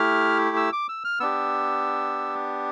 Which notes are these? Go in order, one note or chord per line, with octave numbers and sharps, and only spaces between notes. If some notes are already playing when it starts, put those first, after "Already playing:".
Already playing: A3 E4 G4 F6
E6
D6
E6
F6
B3 D4 G4 E6